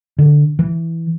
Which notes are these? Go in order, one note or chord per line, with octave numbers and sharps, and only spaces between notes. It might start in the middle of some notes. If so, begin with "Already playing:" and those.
D3
E3